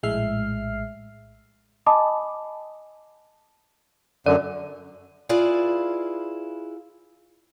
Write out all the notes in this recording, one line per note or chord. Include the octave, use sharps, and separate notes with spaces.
A#1 A2 G#3 E5 F6 C7
D#5 G#5 A5 B5 D6 D#6
F#2 D3 D5
E4 F4 G#4 B4 D5 F5